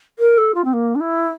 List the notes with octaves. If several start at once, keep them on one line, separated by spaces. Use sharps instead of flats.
A#4
A4
F4
C4
A#3
D4
E4